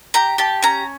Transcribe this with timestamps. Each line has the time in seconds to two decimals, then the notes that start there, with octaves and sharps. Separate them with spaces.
0.14 G4 A#5
0.38 G4 A5
0.63 C#4 A#5